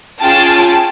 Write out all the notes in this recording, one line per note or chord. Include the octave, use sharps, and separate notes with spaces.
C#4 F4 G#4 G5 A5